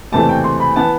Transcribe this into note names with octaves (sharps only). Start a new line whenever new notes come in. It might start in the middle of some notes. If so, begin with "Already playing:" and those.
F#1 E2 C3 E3 A3 A5
G5
C6
B5
E3 B3 A5